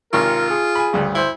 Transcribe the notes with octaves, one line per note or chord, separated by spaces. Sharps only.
G#1 C3 F4 A#4 C#6
G#4
G#5 B5
D2 G2 C#3
E4 C5